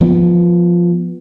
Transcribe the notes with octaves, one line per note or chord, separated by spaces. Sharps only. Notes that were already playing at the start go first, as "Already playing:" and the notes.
F3 B3